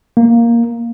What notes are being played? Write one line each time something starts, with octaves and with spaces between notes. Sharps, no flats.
A#3